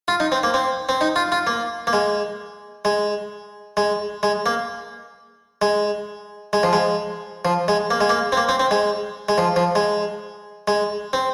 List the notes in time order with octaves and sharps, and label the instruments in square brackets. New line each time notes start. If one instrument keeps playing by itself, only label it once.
[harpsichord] F4
D#4
C4
A#3
C4
C4
D#4
F4
F4
A#3
A#3
G#3
G#3
G#3
G#3
A#3
G#3
G#3
F3
G#3
F3
G#3
A#3
G#3
A#3
C4
A#3
C4
C4
G#3
G#3
F3
F3
G#3
G#3
C4